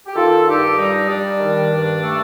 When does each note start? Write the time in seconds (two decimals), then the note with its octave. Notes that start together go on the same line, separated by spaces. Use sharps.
0.06 G4
0.15 D#3 F4 A4
0.47 G2 D#4 G4
0.77 G3 D#4
1.08 G3 D4
1.40 D#3
1.71 G2
2.01 A3